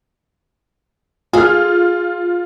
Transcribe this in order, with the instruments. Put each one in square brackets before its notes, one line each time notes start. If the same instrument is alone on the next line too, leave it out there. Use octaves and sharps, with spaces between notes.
[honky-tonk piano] F4 F6 [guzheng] G#4 A4